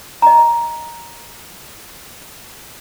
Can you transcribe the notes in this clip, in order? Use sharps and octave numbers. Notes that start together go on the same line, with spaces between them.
D#5 A#5